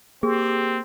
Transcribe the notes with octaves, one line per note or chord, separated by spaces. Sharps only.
A#3 C4 G4 G#4